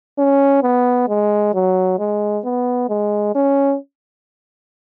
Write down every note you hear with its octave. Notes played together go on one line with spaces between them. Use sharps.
C#4
B3
G#3
F#3
G#3
B3
G#3
C#4